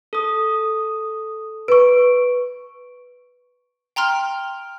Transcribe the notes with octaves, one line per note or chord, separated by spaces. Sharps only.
A4 D#6
B4 C#6 D7
G5 A#5 C6 F6